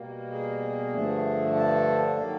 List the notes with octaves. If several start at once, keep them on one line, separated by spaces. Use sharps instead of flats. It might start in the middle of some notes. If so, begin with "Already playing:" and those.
Already playing: B2 G3 A#3
G#4
G2 D3 F3 A3 D4
A4
D#3 F#3 A#3